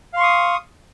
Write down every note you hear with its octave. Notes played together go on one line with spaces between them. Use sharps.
F5 C6 C#6 D#6